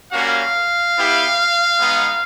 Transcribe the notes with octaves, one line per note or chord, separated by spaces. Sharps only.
G3 A#3 C#4 F#4 F5
B3 E4 G4
G#3 B3 D#4